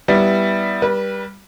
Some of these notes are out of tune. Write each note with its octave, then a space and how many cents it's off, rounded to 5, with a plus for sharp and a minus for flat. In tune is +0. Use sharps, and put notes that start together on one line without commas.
G3 +0 B3 +0 E4 +0
G3 +0 B4 -35